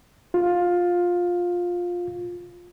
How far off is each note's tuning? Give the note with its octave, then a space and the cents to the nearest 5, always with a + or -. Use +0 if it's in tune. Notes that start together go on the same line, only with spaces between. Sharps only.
F4 +15